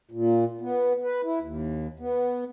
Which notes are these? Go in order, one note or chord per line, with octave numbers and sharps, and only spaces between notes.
A#2
B3
B4
E4
D#2
B3